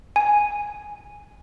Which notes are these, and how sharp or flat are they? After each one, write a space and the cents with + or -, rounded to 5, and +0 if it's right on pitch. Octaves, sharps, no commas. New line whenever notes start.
G#5 +0